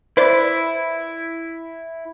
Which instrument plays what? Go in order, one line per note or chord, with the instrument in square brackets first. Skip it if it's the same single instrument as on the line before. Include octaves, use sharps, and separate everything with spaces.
[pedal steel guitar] E4 [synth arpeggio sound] B4 C5 D5